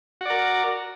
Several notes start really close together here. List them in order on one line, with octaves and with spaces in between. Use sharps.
F#4 D5 A#4